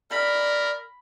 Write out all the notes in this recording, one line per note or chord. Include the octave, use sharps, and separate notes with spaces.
A#4 D5 B5